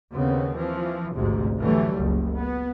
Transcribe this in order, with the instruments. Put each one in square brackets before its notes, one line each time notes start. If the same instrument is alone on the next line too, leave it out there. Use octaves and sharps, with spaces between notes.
[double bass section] D#2 C#3 B3 C4
E3 F3
A1 D2 G#2 C3
D3 E3 F#3 G3 A3
F#1 C#2
B3